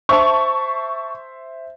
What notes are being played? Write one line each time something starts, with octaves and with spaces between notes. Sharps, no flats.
C5 E5 A5 C#6